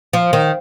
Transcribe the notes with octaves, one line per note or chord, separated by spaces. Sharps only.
F3
D#3